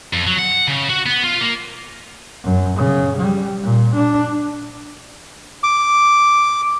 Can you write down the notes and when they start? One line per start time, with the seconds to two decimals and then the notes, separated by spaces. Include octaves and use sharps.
0.13 F2
0.27 F#3
0.39 F#5
0.68 C#3
0.90 F#4
1.06 B3
1.24 F4
1.41 A#3
2.44 F#2
2.77 C#3
3.17 G3
3.63 A#2
3.95 D4
5.63 D6